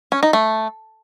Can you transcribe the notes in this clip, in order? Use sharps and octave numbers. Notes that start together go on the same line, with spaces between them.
C#4
D#4
A3